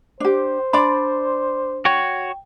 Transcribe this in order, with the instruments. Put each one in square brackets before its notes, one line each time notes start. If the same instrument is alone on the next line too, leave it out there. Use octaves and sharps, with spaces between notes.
[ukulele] D4 G4 [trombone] C5
[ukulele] D4 D5 B5 [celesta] C6 D6
[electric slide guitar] F#4 C#5 [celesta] G5